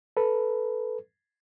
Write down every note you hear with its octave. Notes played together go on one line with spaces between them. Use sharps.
A4 B4